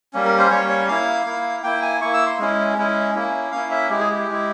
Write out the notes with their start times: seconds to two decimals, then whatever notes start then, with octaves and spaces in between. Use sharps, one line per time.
0.13 G3 A#3 C#4
0.25 A#4
0.38 C5
0.50 G3 A#3 C#4 C#5
0.69 C#5
0.88 A#3 E4 F5
1.26 A#3 E4
1.63 A#3 E4 G5
1.82 G#5
2.01 A#3 E4 C#6
2.14 E6
2.26 C6
2.39 G#3 C#4 E4
2.77 G#3 C#4 E4
3.15 A#3 C#4 E4
3.52 A#3 C#4 E4 F5
3.71 E5
3.89 G#3 E4 G4
3.99 G#4
4.10 G4
4.27 G#3 E4